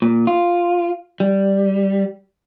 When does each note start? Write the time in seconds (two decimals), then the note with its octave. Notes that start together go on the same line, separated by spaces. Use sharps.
0.02 A#2
0.27 F4
1.20 G3